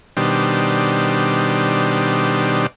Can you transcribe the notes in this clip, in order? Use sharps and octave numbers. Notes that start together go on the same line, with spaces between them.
B2 D#3 G3 D4 C5